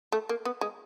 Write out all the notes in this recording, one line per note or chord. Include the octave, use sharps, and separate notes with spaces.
A3
A#3
B3
G#3